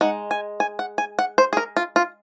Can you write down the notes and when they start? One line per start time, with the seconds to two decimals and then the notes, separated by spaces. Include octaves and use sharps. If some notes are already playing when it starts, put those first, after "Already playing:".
0.01 G#3 D#4 F#5
0.31 G#5
0.60 G#5
0.79 F#5
0.98 G#5
1.19 F#5
1.38 C5
1.53 G#4
1.57 A#4
1.77 F4
1.96 F4